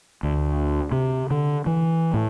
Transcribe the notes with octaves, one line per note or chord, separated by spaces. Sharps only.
D2
C3
D3
E3
A2